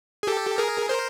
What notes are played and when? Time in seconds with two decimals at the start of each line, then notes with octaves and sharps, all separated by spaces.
0.23 G#4
0.27 G4 A4
0.58 G#4 A#4
0.89 A#4 C5